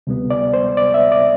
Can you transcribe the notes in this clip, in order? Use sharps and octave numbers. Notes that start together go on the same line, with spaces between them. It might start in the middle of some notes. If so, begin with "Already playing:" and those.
D2 C3 G3 B3
D5
C5
D5
E5
D5